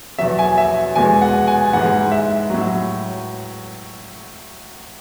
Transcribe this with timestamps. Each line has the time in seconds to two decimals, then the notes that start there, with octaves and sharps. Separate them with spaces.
0.19 E2 B2 F#3 E5
0.39 G#5
0.58 E5
0.95 E2 B2 G#3 G#5
1.22 F#5
1.48 G#5
1.73 G#2 E3 G#3 F#5
2.12 E5
2.50 A2 F#3